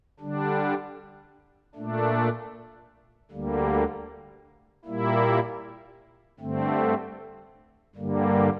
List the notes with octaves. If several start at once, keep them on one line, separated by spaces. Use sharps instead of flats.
D3 G3 D4
A#2 A3 D4
D2 D3 G3 A#3
A#2 G3 A#3 E4
G2 D3 A3 C4
G2 D3 G3 A#3